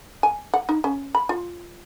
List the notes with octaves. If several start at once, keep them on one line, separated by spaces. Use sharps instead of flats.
G#5
F#5
D#4
C#4
B5
F4